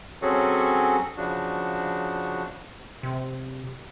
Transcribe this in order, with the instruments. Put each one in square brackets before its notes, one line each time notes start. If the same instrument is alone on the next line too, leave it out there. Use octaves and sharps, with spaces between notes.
[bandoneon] F#3 C4 C#4 F#4 G#4 A4
C#3 F3 D4 F#4
[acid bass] C3